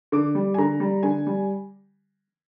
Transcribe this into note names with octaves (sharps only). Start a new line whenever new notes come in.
D3 D6
G3
G#5
D3 A#5
G3
D3 G#5
G3